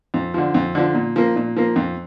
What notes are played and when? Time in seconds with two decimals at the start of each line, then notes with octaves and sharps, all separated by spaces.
0.14 F2
0.34 D3 F3
0.54 F2
0.75 D3 F3
0.95 A#2
1.16 F3 A#3
1.36 A#2
1.57 F3 A#3
1.76 F2